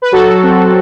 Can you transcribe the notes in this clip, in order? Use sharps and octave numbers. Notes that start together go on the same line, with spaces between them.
B4
F#3 F#4 A4
C4